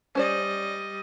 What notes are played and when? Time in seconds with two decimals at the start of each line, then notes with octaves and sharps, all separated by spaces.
0.15 G3 C#4 C5 D5 D#5